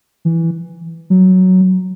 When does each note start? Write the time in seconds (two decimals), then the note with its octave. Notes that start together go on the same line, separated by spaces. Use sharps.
0.25 E3
1.10 F#3